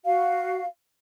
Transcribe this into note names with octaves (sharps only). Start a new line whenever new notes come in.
F#4 F5